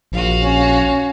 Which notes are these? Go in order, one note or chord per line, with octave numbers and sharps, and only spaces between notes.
A#1 F#4 F5
C#4